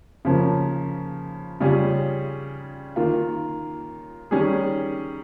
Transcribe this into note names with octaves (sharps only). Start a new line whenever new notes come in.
C#3 F3 A#3 C#4
C#3 G3 C#4 F4 G#4
D#3 A#3 F4
D#3 G3 C#4 G#4